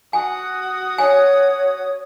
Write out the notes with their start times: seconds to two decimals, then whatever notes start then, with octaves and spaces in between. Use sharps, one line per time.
0.13 F#4 G#5 D#6
0.98 C#5 G#5